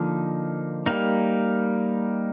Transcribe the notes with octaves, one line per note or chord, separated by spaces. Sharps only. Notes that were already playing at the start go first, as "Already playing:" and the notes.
Already playing: D3 F3 A#3 D#4
G3 A#3 D#4